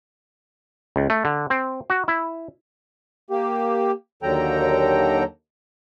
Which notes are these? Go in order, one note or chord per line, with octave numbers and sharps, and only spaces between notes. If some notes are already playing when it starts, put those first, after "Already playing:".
C#2
A3
D3
C4
F#4
E4
A#3 G4
D#2 D3 F#3 A4 G5 A#5